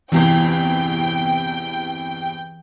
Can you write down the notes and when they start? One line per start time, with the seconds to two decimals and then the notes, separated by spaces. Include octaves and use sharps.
0.12 G1 E2 C3 E3 G5